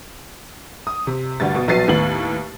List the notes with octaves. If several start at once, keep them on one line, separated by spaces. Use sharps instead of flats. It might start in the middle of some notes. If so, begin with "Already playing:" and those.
D#6
C3
D2 G2 A6
B2
A#1 F#3 B3 A6 C7 D#7
D#2 A2 B3 F#7